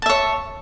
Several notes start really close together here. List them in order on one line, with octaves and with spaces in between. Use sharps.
A5 E5 C#5